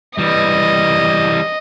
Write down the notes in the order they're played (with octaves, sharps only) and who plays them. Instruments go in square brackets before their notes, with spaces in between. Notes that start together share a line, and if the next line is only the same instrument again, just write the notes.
[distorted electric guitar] E3 G3 [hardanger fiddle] D#5